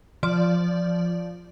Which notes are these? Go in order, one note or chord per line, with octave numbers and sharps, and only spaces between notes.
F3 D5